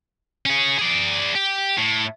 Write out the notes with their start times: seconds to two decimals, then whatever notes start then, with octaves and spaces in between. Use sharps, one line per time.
0.46 C#4 G#4
0.79 G#4 D5
1.35 G4
1.78 A2